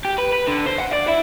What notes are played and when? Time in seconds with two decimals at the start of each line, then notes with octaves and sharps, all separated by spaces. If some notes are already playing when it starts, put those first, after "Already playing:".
0.05 G4
0.18 B4
0.33 B4
0.48 D3
0.67 C5
0.80 F#5
0.93 D5
1.08 E4